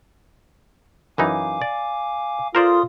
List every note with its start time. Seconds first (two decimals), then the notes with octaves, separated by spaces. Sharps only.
1.18 F#2 E3 D#4 F5 G#5 D6
1.62 D5
2.55 F4 A4 A#4 C5 D5 C6 D#6